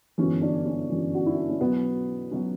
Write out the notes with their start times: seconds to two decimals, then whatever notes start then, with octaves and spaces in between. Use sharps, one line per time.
0.18 G1 F#2 E3 C#4
0.42 D4
0.65 C#4
0.90 G1 F#2 E3
1.15 F#4
1.26 E4
1.37 D4
1.49 C#4
1.61 B1 B2 F#3 B3
2.31 B2 F#3 C#4